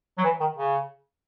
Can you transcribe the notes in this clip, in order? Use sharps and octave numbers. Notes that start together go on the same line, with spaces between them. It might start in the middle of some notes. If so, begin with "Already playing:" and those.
F#3
E3
D#3
C#3